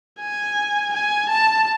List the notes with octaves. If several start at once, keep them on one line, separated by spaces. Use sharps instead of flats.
G#5
G#5
A5